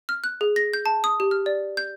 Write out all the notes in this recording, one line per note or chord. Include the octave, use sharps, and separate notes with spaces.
F6
F#6
G#4
A#6
G6
A5
D#6
G4
F6
D5
G6